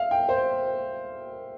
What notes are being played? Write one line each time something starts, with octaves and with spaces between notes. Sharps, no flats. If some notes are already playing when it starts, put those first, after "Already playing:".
Already playing: E5 F5
G5
C5